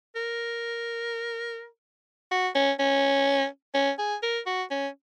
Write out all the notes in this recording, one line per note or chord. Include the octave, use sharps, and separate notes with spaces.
A#4
F#4
C#4
C#4
C#4
G#4
A#4
F#4
C#4